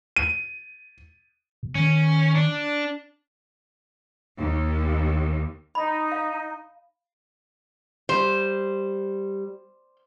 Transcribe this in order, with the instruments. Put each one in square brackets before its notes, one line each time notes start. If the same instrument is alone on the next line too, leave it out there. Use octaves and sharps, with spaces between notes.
[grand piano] D#7
[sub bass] B2
[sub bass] D#3 [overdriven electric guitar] C#4
[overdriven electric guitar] D4
[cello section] D#2
[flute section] D#4 [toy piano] B5
[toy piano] F5
[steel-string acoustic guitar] G3 [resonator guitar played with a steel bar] C5